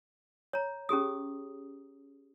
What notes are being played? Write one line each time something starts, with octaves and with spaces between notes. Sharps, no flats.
C#5 A#5
C#4 G4 G#4 D#6